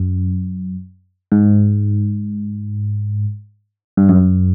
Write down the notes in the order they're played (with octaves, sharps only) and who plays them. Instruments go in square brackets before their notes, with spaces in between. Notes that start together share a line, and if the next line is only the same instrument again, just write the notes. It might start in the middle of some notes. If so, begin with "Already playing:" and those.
Already playing: [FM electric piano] F#2
G#2
G2
F#2